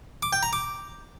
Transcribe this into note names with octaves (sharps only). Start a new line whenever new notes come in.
D6
G5
A#5
D6